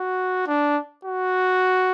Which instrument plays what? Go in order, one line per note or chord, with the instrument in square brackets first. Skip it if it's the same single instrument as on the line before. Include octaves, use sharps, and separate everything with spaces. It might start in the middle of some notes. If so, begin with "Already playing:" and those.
Already playing: [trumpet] F#4
D4
F#4